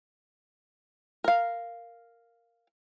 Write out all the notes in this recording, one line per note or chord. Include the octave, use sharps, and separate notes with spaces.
A#4 F5